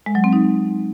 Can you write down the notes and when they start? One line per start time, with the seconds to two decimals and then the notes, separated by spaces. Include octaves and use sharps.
0.06 G#3
0.15 F#3
0.24 C4
0.33 D#4